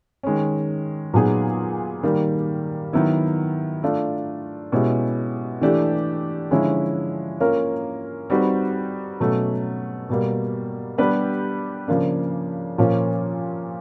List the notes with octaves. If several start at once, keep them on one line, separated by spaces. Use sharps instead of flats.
D#3 G#3 C#4
A#2 F#3 B3 D#4 G#4
D#3 G3 A#3
D#3 F#3 B3 E4
A3 D4 F4
B2 G#3 C#4 E4 G4
E3 A3 D4 G4
D3 F3 G#3 C#4 E4
A#3 C#4 F4 A#4
G3 C4 D#4 F#4 B4
B2 F#3 A3 C#4
B2 G3 A#3
G3 B3 D4 G4 B4
C#3 F3 A#3 D4
A#2 F3 A#3 C#4